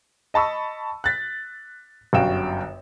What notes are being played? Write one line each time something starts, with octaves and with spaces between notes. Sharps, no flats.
D#5 A5 B5 C#6 E6
F#6 A6 B6
G1 F#2 F#4 F5 G5 E7